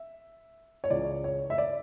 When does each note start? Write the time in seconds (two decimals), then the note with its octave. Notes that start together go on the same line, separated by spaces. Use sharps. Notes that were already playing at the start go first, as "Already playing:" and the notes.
Already playing: E5
0.84 C#5
0.90 C#2 C#3 E3 D5
1.24 C#5
1.50 E5
1.58 D5